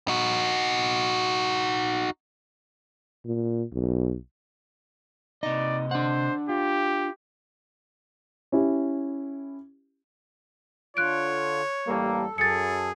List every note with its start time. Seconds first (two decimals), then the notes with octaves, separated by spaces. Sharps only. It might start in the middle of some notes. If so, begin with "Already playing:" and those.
0.08 D#4 F#4
3.25 A#2
3.73 B1
5.43 C3 D#4 D5 D#5
5.91 D4 C5 F#5
6.49 F4 G4
8.52 C#4 E4 G4
10.97 D3 F4 C#5 F#6 D7
11.88 A1 G3 A#3 A4
12.38 F#2 G#4 A6 C#7